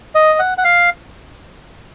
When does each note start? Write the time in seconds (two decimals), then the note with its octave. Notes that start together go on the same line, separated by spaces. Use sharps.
0.15 D#5
0.39 F#5
0.58 F#5
0.64 F5